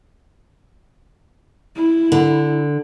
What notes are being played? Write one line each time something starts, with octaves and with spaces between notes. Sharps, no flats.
E4
D3